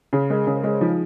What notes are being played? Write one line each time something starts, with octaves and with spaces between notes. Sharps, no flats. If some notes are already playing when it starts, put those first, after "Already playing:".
C#3 G#4
G#3 A#4
C#3 A#4
C5
G#3 C#5
C5
F3 D#4